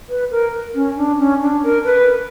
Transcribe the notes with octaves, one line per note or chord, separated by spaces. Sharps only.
B4
A#4
C#4
D4
C#4
D4
A#4
B4